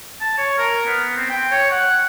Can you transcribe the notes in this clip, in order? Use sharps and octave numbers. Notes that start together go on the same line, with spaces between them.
A5
C#5
A#4
B3
C4
G5
C#5
F#5